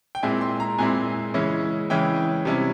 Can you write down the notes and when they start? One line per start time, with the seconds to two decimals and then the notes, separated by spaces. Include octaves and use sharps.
0.15 G5
0.23 A#2 G#3 C4 E4 G#5
0.41 C6
0.60 A#5
0.78 A#2 G#3 C4 E4 G#5
1.34 C#3 E3 G#3 C#4 E4
1.90 C#3 E3 G#3 C#4 E4 G5
2.45 C3 G3 C#4 E4